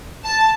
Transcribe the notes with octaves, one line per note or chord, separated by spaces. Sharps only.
A5